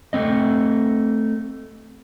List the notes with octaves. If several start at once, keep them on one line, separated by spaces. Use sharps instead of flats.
A3 C4 D#5